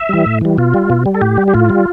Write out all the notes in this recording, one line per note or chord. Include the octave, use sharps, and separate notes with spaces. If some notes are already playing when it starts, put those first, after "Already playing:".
Already playing: E5
E3 G3
A2
E3 G3
B2 F4
G3
B2
G3
A4
A2 G4
G3
G4
A2 F4
G3